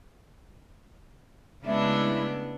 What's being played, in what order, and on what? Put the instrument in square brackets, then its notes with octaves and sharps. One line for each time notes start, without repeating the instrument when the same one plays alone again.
[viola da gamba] C#3 B3 D4 [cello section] G#3 A3 [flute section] E4